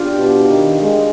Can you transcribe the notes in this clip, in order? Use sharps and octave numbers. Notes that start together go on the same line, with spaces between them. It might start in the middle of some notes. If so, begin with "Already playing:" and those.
Already playing: D4 F4 G4
B2
D#3
G#3